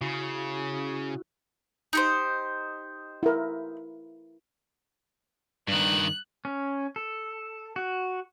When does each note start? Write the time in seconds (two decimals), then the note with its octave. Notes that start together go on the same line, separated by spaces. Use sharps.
0.01 C#3 E4 F#4
1.93 D#4 G4 C5
3.23 E4 A#4
5.68 G2 D#3 F#6
6.45 C#4
6.96 A4
7.76 F#4